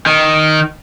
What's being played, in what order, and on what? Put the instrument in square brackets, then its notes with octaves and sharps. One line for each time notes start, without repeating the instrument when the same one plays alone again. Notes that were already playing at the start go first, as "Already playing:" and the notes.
[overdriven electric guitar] D#3